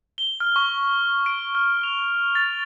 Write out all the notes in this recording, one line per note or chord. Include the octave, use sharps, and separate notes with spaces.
G7
F6
C#6
D7
F6
F7
A6